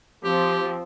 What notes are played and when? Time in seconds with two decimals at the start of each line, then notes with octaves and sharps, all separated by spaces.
0.24 F3 C4 G4